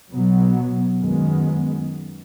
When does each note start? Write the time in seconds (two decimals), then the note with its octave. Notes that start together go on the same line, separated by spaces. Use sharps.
0.12 B2 F#3 B3
1.01 F#2 D#3 G#3 B3